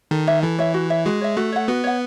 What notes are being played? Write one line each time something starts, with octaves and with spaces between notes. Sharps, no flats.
D#3 A4
C#5 E5
E3 A4
C#5 E5
F#4
C#5 E5
G#3 F#4
C#5 E5
A3 F#4
C#5 F#5
B3 F#4
C#5 F#5